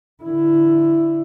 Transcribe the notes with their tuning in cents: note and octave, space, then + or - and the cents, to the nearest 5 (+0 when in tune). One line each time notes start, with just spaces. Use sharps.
D3 +15 E4 +10